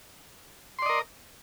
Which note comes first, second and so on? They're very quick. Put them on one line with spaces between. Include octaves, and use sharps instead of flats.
C6 D5 D#5 A#4